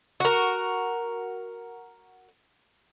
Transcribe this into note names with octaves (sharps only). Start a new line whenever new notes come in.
F#4 A#4